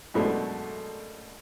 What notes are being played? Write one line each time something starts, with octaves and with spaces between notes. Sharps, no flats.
F#2 B2 G#3 A3 D4